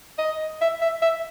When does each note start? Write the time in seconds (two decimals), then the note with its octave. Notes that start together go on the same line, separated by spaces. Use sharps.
0.19 D#5
0.61 E5
0.82 E5
1.02 E5